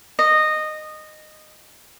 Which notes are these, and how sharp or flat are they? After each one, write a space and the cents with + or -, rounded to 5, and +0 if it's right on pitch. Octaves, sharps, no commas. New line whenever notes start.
D#5 -15